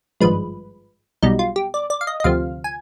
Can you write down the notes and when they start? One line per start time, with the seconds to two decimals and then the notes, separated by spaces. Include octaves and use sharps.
0.21 G#1 G2 F3 G#3 B4
1.22 B1 B2 G3 D#4
1.39 F4
1.56 G4
1.74 D5
1.90 D5
2.01 F5
2.07 D#5
2.20 D#5
2.24 D2 C3 F3 F5
2.64 G#5